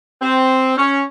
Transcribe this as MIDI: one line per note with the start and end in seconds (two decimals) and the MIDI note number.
0.22 0.77 60
0.77 1.02 61